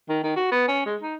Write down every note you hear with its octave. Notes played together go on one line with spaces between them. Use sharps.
D#3
D#3
F#4
B3
C#4
G#3
D#4